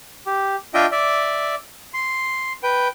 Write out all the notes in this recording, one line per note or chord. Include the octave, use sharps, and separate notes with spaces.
G4
D4 F4 D#5 E5 G5
D5 E5
C6
B4 G5